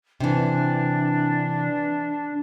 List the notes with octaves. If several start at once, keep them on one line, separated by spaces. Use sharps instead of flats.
C3 E3 D4